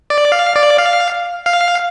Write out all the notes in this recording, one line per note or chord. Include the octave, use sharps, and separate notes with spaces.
D5
F5
D5
F5
F5